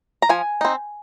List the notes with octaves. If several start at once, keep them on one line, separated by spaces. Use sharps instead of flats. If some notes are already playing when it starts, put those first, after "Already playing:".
A#5
F3 G#5
C4 D#4